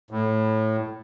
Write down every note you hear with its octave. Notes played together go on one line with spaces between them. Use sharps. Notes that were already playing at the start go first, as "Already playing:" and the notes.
A2